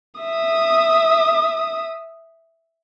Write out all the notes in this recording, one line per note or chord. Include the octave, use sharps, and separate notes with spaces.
E5 D#6